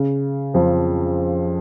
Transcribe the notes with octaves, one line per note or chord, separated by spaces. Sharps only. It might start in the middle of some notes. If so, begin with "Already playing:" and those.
Already playing: C#3
F2 F3